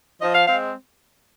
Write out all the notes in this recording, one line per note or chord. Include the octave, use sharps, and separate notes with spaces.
F3 D#5
F5
G#3 C4 F5